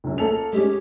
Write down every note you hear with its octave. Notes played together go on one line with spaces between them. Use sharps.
C#2 F#2
A#3 A4 F7
G#3 C#4 G4